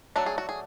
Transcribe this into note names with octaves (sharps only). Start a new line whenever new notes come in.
F#3 A3 D4 F#4
G#4
F#4
G#4